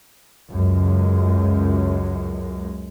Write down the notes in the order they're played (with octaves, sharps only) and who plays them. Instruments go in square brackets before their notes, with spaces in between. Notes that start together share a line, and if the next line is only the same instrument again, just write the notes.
[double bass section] C#2 F#2 G#3